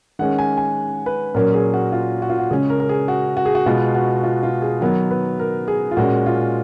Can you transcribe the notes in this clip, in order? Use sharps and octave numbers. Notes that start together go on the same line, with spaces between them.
D#3 G#3 C#4 F#5
G#5
G#5
B4
A#2 F#3 A#3 C#4 A#4
G#4
F#4
F4
F#4
F4
F#4
C#3 G#3 C#4 G#4
A#4
A#4
G#4
F#4
F#4
G#4
F#4
B2 G#3 B3 F4
F#4
F4
F4
G#4
D#3 F#3 B3 A#4
B4
A#4
G#4
F4
A#2 G#3 C#4 F#4
F4